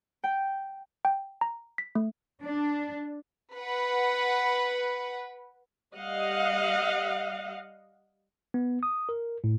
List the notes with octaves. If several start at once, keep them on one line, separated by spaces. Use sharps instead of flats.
G5
G5
A#5
B6
A3
D4
B4 F#5
G3 D#5 F5 F#5
B3
D#6
A#4
A2